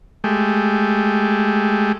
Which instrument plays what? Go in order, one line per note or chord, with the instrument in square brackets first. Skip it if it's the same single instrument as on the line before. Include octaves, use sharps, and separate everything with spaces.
[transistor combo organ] G#3 A3 G4